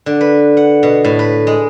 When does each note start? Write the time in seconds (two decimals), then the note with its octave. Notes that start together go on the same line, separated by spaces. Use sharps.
0.06 D3
0.21 B4
0.57 F#5
0.83 B2
1.04 A2
1.19 B4
1.47 G#3